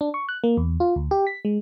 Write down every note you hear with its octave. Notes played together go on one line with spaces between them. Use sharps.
D4
C#6
F#6
A#3
E2
F4
D2
G4
B6
G#3